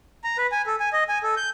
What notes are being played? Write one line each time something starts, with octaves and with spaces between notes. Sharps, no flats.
A#5
B4
G#5
A4
G#5
D#5
G#5
A4
G6